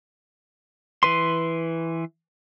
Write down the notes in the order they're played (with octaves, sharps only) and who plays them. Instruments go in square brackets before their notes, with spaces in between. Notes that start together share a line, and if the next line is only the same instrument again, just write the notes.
[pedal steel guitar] E3 B4 C6